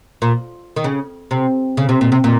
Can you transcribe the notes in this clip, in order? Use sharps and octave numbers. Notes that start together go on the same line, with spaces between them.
A#2
D#3
C#3
C3
C#3
C3
A#2
C3
A#2